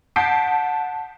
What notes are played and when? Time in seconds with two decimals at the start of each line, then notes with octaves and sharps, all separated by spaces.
0.16 F#5 A5 G6 B6 C7 D7